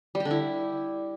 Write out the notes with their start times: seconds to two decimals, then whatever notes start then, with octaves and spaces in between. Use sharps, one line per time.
0.15 G3
0.20 G4
0.25 D3
0.31 E4